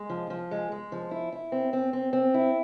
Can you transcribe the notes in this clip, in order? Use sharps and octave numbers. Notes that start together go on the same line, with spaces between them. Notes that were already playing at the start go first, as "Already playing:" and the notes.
Already playing: G#3
F3
F3
G#3
G#3
F3
E4
E4
C4
C4
C4
C4
E4